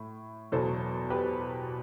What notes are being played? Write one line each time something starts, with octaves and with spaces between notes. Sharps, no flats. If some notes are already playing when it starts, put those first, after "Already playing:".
Already playing: A2
E2 B2 F#3 A4 C5
G4 B4